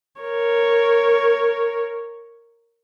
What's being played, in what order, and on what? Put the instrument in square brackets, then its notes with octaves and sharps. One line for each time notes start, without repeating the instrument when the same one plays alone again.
[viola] A#4 C#5